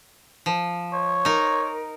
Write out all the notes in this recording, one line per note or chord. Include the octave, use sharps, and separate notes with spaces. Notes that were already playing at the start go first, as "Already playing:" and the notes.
F3
C#5
D#4 A#4